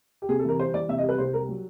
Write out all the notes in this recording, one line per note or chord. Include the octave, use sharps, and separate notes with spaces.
G4
C3 G#4
A4
E3 A#4
G3 C5
E3 D5
C3 E5
D#5
G3
B4
C2 C5
G3 A#4
F#3